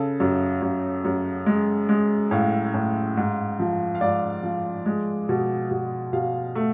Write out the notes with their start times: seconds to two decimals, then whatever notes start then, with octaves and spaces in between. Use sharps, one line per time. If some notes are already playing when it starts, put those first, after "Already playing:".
Already playing: C#3 A4
0.20 F#2
0.62 F#2
1.05 F#2
1.46 G#3
1.89 G#3
2.31 A2 F5
2.74 A2
3.17 G#2
3.60 F3
3.95 F5
4.01 G#2 D5
4.43 F3
4.86 G#3
5.29 B2
5.71 B2
6.13 B2 F5
6.55 A3